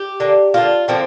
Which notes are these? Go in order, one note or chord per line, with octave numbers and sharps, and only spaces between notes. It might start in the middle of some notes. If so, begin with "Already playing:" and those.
Already playing: G4
D3 A#3
D3 A#3 F4
D3 F3 A#3 C4